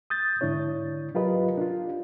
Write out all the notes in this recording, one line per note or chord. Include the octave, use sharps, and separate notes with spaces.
D#6 G6 A6
G#2 D3 D4 E4 C#5
F#3 F4 G4 A#4 B4 D#5
D4 F4